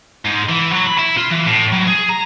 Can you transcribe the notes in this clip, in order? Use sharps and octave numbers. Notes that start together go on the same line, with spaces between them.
G#2
E3
F#3
B5
E4
F4
E3
A2
F#3
G#4
A#5